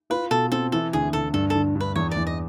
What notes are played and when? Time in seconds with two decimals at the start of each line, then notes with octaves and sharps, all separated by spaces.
0.10 F4 B4
0.31 B2 A4
0.52 C4 A4
0.72 E3 A4
0.93 D2 G#4
1.13 D2 A4
1.34 G2 A4
1.50 A4
1.55 D3
1.75 G2
1.80 B4
1.96 E2 C#5
2.11 D5
2.17 E2
2.27 D#5